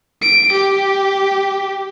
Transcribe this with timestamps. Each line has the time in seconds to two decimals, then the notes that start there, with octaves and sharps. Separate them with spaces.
0.22 D7
0.52 G4